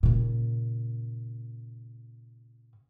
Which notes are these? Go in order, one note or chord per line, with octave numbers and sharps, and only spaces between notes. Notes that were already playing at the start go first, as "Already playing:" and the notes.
A#2 C#3